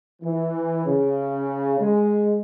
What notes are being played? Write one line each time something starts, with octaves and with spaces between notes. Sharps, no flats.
E3
C#3
G#3